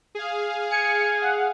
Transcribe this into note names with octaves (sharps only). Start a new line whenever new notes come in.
G#4 F5
G#5 C#7
F#5